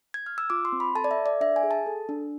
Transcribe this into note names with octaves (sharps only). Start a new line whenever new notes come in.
G#6
F6
E6
F4 D6
C6
C4
B5
A4 A5
D5
E5
A4
D5
D4 E5
G#5
G#4
A5
A4
D4